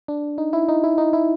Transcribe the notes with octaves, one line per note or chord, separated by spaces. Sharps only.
D4
D#4
E4
D#4
E4
D#4
E4